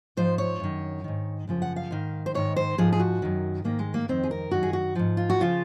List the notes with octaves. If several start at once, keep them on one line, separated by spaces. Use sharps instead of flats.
G#2 F3 C5
C#5
F#2 D#3
G#2 D#3
F#2 C#3 F3
F#5
F5
G#2 D#3
C5
G#2 D#3 C#5
C5
G#2 F3 G#4
G#4
F#4
F#2 D#3
G#2 D#3 A#3
G#3
A#3
F2 D#3 C4
G#4
A#4
F#2 D#3 F#4
G#4
F#4
G#2 F3
F4
F#4
C#3 F3 F4